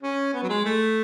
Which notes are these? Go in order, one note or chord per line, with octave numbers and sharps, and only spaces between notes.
C#4
B3
F#3
G#3
A3